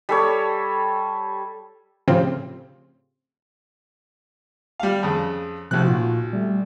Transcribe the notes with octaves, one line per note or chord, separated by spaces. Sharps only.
G3 A4 C#5
A2 C#3 F3 C4 F4 G4
G3 F5
F2 C#3
B1 C3 F3 A3 F#6
A#2 F4 F#4
G3 A3